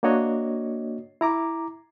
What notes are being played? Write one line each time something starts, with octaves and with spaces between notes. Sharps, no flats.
A#3 D4 F#4 C#5 D#5
E4 A#5 D6